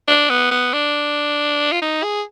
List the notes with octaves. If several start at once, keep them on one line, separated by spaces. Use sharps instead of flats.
D4
B3
B3
D4
F4
D#4
G#4